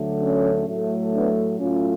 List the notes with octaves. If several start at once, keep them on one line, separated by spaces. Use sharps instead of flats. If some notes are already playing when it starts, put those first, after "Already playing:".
Already playing: D2 D3 F#3 A3
C#4
A2 F#3 A3
B3 D4
A2 F#3 A3 C#4 F4